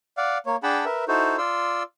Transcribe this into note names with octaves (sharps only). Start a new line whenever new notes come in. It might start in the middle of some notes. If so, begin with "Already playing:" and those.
D5 F5 F#5
A#3 C#5
D4 G#4 F#5 G5 A5 B5
A#4 B4 E5
D#4 E4 F#4 A4 C5
F4 D5 C6 E6